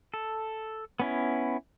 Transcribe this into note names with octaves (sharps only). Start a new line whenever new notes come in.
A4
B3 C#4 E4